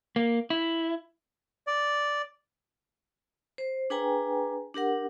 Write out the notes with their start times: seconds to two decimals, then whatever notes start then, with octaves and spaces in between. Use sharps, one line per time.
0.16 A#3
0.50 E4
1.67 D5
3.58 C5
3.90 D4 G#4 B4 G5 G#5 A#5
4.74 D4 G4 A#4 F#5